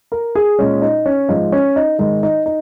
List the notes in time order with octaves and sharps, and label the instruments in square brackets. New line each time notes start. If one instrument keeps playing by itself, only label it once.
[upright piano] A#4
G#4
A#2 G#3 C#4
D#4
C#4
G#2 F3 G#3 D#4
C#4
D#4
G#2 D#3 G#3 D#4
D#4
D#4